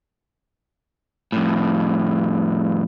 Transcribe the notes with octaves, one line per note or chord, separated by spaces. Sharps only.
F2 A2